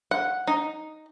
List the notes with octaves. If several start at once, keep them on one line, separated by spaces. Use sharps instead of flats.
F#5
D#4